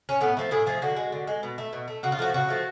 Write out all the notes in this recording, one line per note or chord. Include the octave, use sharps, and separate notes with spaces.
C#4
A2 B3
F3 A3
A2 G#4
F3 A3 G#4
D3 F#4
G#3
D3
G#3
B2
A3
B2
A3
C#3 F#4
F4
F3 A3 F#4
C#3 F#4
F3 A3